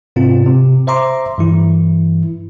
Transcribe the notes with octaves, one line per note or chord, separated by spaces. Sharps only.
G#2 C3 C4 F4
C3
C5 E5 A#5 C6 D6
G2 E3 E4